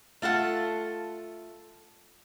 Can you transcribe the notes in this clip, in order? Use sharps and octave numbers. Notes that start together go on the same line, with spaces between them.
A3 F4 A4 F#5